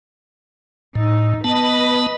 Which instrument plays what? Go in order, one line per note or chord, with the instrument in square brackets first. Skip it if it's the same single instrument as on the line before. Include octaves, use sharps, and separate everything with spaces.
[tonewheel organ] A2 [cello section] D#4
[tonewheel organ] B3 A5 [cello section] B4 D#5